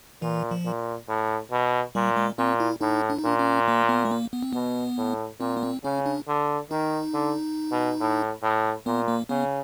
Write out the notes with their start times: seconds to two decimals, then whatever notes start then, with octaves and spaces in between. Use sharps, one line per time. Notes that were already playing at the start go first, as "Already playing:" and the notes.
0.22 A#2 E3
0.51 F3
0.65 A#2
1.09 A2
1.51 B2
1.95 A#2 G3
2.16 G#3
2.38 A#2 C4
2.60 E4
2.81 A2 D#4
3.10 D4
3.18 D#4
3.25 A#2 D4
3.39 C#4
3.68 A#3
3.89 B3
4.05 A3
4.11 A#3
4.33 B3
4.43 C4
4.53 B2 B3
4.97 A2
5.40 A#2 C4
5.57 B3
5.63 C4
5.84 C#3 C#4
6.06 D4
6.28 D3
6.70 D#3 D#4
7.14 D3
7.71 B2
8.01 A2
8.43 A2
8.86 A#2 B3
9.08 A#3
9.29 C#3 B3